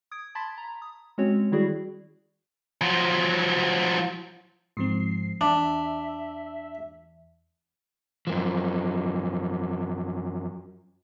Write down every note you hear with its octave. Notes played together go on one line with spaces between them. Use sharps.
D#6 G#6 D7
A5 B5 C6 G#6 A6 B6
A#5
D#6
G#3 C4 C#4 F#4 C#5
D#3 G3 E4 F#4 G#4 D5
F3 F#3
G#2 F3 C4 C7
E2 D4 E5
F#2 F3